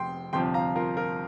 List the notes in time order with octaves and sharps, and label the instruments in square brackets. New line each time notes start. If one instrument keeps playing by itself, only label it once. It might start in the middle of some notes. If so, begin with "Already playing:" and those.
Already playing: [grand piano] F1 G5 C6
G1 F2 C3 F3 G5 C6
F5 A#5
F4 A#4
F4 A#4